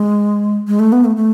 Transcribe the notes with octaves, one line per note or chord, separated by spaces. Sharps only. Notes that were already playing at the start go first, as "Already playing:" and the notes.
Already playing: G#3
G#3
A3
B3
A3
A3